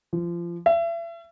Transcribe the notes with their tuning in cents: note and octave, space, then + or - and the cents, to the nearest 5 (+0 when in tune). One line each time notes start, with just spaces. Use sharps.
F3 -25
E5 +35